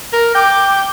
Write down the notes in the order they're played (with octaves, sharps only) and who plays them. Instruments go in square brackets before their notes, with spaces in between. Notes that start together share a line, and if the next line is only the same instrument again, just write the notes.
[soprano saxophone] A#4
[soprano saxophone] G5 [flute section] D6